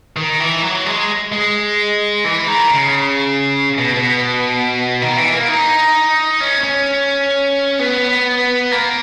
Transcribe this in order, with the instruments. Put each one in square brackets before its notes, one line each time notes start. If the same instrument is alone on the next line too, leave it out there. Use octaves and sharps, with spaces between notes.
[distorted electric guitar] D#3
E3
F#3
G#3
G#3
E3
D#3
C#3
B2
B2
D#3
E3
A#3
D#4
C#4
C#4
B3
A#3